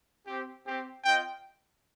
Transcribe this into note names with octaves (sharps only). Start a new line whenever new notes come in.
C4 G4
C4 G4
C4 F4 D#5 G5